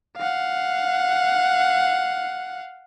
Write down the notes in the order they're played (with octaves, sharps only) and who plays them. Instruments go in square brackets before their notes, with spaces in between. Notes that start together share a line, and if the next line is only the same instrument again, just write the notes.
[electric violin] F5 F#5